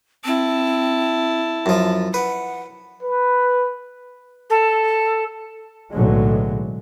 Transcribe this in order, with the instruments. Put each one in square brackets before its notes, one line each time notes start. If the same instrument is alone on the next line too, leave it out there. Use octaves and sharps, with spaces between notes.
[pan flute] C4 [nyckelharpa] E4 A5
[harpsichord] F#2 F3
[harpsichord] B4 [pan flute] F#5
[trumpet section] B4
[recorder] A4
[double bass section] B1 A2 D3 F#3 G#3